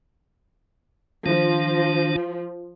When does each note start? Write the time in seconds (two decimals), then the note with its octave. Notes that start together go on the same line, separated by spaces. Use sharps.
1.26 D#3 F3 D4